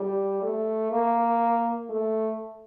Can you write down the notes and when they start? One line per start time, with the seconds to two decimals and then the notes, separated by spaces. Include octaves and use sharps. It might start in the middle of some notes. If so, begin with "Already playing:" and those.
Already playing: G3
0.42 A3
0.91 A#3
1.89 A3